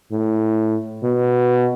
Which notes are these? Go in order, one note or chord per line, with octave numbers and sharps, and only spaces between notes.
A2
B2